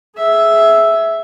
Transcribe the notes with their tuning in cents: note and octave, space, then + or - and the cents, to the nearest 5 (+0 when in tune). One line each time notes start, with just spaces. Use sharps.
G#4 +20 E5 +0